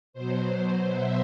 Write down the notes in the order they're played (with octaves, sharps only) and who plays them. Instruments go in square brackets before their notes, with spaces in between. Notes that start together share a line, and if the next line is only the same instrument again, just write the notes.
[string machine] B2 F#3 C5
E5